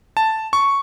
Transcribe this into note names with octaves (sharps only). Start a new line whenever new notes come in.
A5
C#6